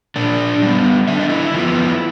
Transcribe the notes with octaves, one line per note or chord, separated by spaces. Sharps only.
A#2 D4 D5
G3 B3
D3 E5
D#5
E4 E5
F3 G#3 B3